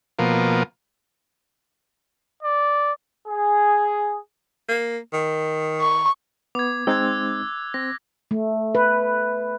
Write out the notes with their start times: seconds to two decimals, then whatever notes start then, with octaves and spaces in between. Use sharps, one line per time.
0.19 B2 F3 A#3
2.43 D5
3.28 G#4
4.68 A#3
5.13 D#3
5.80 C#6
6.55 B3 D6 G#6
6.87 G#3 C4 D#4 E6 F#6 G#6
7.74 C4 A#6
8.31 A3
8.75 B4